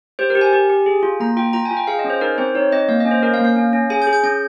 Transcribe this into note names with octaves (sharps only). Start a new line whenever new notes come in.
G4 C5
A#4
G4
G#5
G4
G4
G#4
F4
A#3 A#5
F4 G5
F4 A#5
G#5
F4
G5
G#4 F5
D#5
C#4
C5
D#4 A#4
C4 C5
D#4 C#5
C4 D#5
A#3 F5
C#4 D#5
C5
C#4 A#4
F5
A#3
F5
C#4
C#4
G#4 G#5
G6
G#4
G6
C#4 G6